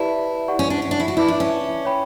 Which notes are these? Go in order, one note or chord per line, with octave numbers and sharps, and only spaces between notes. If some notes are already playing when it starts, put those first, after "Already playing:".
Already playing: E4 G4 B4 D5 A5
G4 D5 F#5 C#6
C#4
D4
C#4
D4
E4
F#4
E4 B4 D5 A5 D6
D4
C#4
C#5 G5 B5